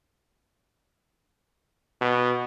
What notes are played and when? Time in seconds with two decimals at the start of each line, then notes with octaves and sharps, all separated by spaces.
2.01 B2